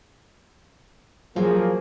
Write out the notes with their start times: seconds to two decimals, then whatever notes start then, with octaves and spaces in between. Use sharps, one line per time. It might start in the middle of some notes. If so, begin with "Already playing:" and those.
1.36 F3 F#3 A#3 G#4